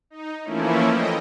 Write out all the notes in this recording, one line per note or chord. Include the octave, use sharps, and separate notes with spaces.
D#4
E3 F3 A3 A#3 C#4 E4
D#5 G5